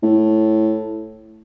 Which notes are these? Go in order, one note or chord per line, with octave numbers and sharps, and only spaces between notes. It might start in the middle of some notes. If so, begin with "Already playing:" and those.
A2